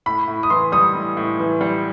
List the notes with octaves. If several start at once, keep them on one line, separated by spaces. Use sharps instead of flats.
A2 B5
A2
D#6
E3 C6
G3 D#6
A2
A2
E3
G3